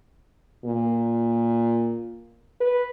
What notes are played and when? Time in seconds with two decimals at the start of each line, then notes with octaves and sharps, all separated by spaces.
0.65 A#2
2.61 B4